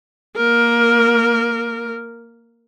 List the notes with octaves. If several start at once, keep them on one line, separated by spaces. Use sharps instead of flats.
A#3 A#4